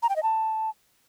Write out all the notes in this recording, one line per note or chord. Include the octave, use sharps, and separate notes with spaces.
A#5
G5
D#5
A5